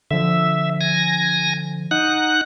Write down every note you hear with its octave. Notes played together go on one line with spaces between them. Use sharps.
D3 F3 E5
G#5 A#6
D#4 F#5 F#6